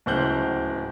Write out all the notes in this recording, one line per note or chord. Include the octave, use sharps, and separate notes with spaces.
D1 C#2 C5 F#6 G6